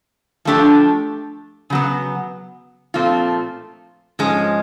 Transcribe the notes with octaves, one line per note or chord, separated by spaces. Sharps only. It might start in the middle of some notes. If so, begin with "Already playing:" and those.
F3 A3 D4 G4
C#3 F#3 B3
A#2 F3 A3 C4 F4
G#2 F3 G#3 C#4